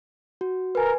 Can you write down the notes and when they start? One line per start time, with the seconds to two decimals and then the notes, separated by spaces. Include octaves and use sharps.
0.41 F#4
0.75 A#4 B4 G#5